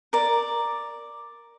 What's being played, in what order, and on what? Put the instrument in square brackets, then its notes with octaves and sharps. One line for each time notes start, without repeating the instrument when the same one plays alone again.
[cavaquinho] A#4 D5